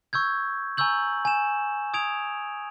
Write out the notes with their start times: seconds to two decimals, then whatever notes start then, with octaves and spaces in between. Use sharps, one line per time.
0.13 C#6 E6 G6 G#6
0.77 G#5 A#5 C#6 E6 G6 F#7
1.25 G#5 E7
1.94 D#6 G#6 D7 F7